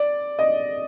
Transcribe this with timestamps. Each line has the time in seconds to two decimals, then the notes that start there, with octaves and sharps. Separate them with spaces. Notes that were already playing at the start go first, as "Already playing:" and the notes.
Already playing: D5
0.39 D#5